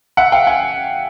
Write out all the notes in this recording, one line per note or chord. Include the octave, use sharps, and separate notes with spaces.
E5 F#5
F5 G5
F#5 G#5